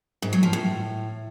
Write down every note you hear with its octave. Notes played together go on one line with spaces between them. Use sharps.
G#2
F#3
F3
A2